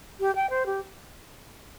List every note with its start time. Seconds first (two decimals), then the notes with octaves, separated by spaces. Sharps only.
0.20 G4
0.36 G5
0.50 C5
0.66 G4